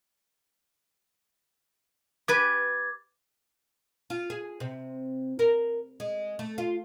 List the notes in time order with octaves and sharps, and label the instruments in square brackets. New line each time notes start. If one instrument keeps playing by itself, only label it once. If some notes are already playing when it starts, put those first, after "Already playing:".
[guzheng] G4 B4 G#5 [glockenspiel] D6 G#6 A6
[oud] F4
G#4
C3
A#4
G#3
A3
F4